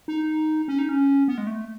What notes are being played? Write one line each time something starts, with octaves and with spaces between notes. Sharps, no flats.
D#4
C#4
D#4
C#4
B3
G#3
A3